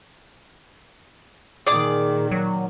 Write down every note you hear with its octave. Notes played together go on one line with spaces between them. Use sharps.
A#2 D#3 G#4 D5 D6
F#3